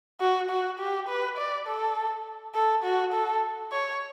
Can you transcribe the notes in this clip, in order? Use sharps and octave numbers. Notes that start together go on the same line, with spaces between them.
F#4
F#4
G4
B4
D5
A4
A4
F#4
A4
C#5